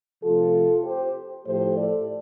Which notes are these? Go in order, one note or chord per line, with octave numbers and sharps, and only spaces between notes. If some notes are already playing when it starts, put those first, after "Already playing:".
C3 F3 A3 F4 A4
G4 C5
A2 F3 A3 G4 C5
A4 D5